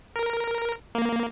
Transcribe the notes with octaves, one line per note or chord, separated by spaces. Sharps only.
A#4
A#3